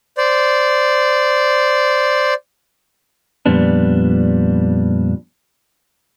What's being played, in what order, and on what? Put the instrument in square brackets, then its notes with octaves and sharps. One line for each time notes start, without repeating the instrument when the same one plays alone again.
[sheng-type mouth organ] C5 D5
[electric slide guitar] F2 A#2 G3 B3 D4